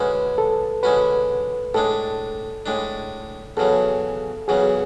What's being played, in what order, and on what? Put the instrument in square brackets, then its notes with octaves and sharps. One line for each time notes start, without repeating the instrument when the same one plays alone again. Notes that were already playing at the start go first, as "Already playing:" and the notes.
Already playing: [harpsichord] D3 G#3 C#4 F#4 [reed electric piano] B4
[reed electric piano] A4
[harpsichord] D3 G#3 C#4 F#4 [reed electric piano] B4
[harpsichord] A2 G#3 D4 [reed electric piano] A4
[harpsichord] A2 G#3 D4
[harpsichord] E2 C#3 F#3 [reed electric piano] A4
[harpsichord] E2 C#3 F#3 [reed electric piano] G#4